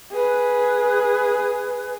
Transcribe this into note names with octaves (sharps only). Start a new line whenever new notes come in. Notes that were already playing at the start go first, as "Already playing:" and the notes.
G#4 B4